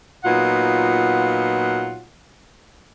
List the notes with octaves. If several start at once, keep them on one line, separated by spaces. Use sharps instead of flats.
A#2 F#3 B3 D#4 F4 F#5